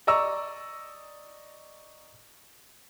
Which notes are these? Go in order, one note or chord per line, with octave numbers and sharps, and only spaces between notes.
D5 D#5 A#5 C#6 E6